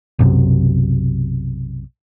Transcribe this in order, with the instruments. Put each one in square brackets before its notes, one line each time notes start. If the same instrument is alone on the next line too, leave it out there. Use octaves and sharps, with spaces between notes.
[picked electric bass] B1 F#2 C3